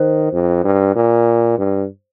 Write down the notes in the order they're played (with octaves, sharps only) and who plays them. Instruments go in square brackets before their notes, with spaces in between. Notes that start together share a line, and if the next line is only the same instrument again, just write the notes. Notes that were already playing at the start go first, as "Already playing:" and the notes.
Already playing: [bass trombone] D#3 [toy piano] C5
[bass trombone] F2
G2
A#2
G2